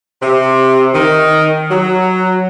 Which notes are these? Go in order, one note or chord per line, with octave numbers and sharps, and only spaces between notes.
C3
D#3
F#3